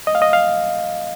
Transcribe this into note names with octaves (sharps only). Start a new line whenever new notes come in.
D#5
F5
D#5
F5